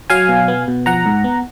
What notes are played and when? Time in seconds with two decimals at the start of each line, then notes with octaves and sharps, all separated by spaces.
0.10 F#3 F5 G#5
0.29 B2
0.48 B3
0.68 B2
0.86 F3 F#5 A#5
1.06 G#2
1.24 B3